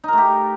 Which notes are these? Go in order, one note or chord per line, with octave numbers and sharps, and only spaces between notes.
A3 D#4 G4 A#4